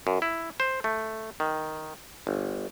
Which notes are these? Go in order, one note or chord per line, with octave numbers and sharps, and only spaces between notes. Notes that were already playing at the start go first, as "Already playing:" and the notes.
F#2
E4
C5
A3
D#3
G1